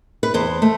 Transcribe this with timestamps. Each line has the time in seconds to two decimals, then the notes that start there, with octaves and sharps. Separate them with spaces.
0.23 B4
0.34 E2 C5
0.62 A3